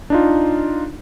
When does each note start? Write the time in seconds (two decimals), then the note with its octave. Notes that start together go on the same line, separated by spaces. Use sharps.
0.10 D4 D#4 F4